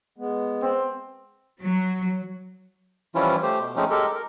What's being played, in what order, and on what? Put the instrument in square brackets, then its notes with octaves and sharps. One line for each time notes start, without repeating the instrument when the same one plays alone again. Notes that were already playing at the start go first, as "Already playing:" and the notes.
[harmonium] G#3 B3
[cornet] C4
[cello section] F#3
[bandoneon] E3 F3 G3 C#4 E4 F4
A3 G4 C5
B2
F3 G#3 A3 C4 C#4 D#4
G#3 G4 A4 A#4
A#4